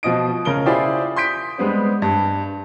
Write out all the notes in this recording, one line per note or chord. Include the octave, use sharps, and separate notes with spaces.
B2 F3 F4 D#5 D#6 D7
C#3 A#4 D7 G7
E4 F4 G4 G#4 C5 D5
C6 D#6 G6 B6 D7
G3 G#3 B3 C4
G2